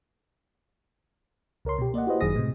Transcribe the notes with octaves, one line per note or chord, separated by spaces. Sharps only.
C#2 A#4 C#5 C6
B2 G4
A#3 D5 D#5 F#5
E4 F#4 G4 B4 C5 D#5
G1 F#2 D#3 G#4 D#6 A#6
A2 C3